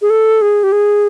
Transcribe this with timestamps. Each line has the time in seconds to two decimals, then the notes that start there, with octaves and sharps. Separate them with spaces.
0.02 G#4
0.10 A4
0.41 G#4
0.63 G4
0.72 G#4